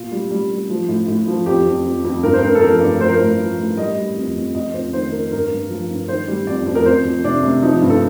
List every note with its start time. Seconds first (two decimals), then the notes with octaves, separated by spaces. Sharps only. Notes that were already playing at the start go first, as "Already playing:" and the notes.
Already playing: A#2 F4
0.12 G3
0.31 G3
0.51 G3
0.70 F3
0.88 A2
1.08 A2
1.28 F3
1.46 F2 G4
1.66 F2
1.85 F2
2.04 F2
2.23 G2 A#4
2.33 C5
2.43 G2 A#4
2.55 A4
2.62 F3 A#4
2.81 G2 D5
3.00 F3 C5
3.08 A#4
3.16 A2 C5
3.40 F3
3.59 A2
3.77 G3 D#5
3.97 G3
4.17 F2
4.36 F2
4.55 F2 D#5
4.73 F2 C5
4.93 D#3 C5
5.12 F2 A#4
5.32 G2 A#4
5.51 G2
5.70 F3
5.90 G2
6.08 D#3 C5
6.28 G3
6.47 F2 D5
6.66 F2
6.75 A#4
6.86 F2 C5
7.05 F2
7.24 C3 D4
7.44 C3
7.62 F3 D#4
7.82 G2
7.90 A4